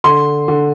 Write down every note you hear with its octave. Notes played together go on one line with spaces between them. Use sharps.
D3 C6
D3